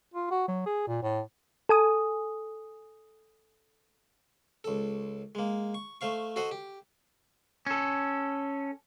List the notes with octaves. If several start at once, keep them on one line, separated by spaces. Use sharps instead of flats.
F4
F#4
F#3
G#4
A#2
A2
A4 G#5 D#6
C#2 A4
G#3 A#3
C#6
A3 C5 F5 C#6
F#4 A4 C5 D#5 F#5
G4
C#4 A4